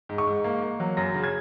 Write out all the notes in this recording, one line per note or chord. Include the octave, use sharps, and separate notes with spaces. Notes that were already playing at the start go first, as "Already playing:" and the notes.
G#2
C#6
G#2
A#3
A#3
F#3
F#2 A#6
C#3
G#6